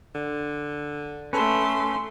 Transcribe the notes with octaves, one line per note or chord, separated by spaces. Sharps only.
D3
A3 C#4 A4 B4 C6